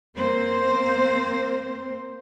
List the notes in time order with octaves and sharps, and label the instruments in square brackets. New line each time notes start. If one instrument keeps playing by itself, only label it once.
[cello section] A#3 C4 C5